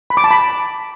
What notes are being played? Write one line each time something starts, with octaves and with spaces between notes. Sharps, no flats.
B5
D6
A5
B5